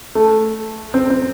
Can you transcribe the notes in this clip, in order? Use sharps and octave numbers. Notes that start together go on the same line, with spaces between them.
A3
C4
C4